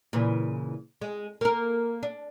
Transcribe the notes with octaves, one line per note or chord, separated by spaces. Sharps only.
A#2 C#3 E3
G#3
A#3 A#4
D4